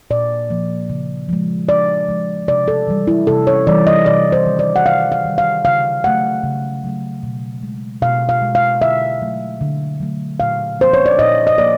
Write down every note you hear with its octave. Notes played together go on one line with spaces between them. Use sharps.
A#2 D5
F3 A#3
C#3
F3 G#3
C#3 D5
F3 G#3
C3 D5
A4
E3 G3
E4
C3 A4
C#5
E3 G3 D5
D#5
C3 D5
C5
D#3 G3
D5
F#5
C3 F5
F5
D#3 G3
F5
C#3 F5
F#3 A3 F#5
C#3
F#3 A3
B2
G#3
B2 F5
F5
G#3
F5
D3 E5
F#3 A3
D3
F#3 A3
A#2 F5
F3 A#3 C5
C#5
D5
A#2 D#5
D#5
F3 A#3 D5